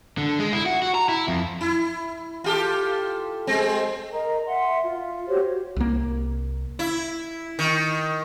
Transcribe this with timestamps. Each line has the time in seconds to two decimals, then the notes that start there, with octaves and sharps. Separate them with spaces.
0.17 D3
0.39 G#3
0.53 E4
0.66 F#4
0.82 F#4
0.95 A#5
1.09 E4
1.28 F2
1.61 E4
2.44 F4 G4 A4
3.47 G#3 C4
4.12 A#4 D#5 A#5
4.46 E5 F#5 C6
4.84 F4
5.28 F#4 G4 C5 C#5
5.76 C2 A#3
6.79 E4
7.59 D#3